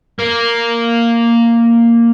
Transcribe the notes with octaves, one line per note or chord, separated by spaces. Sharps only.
A#3